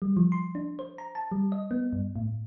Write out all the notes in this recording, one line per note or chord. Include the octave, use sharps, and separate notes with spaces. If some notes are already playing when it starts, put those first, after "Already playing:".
G3
F3
C6
D4
C5
A#5
A5
G3
D#5
B3
G2
A2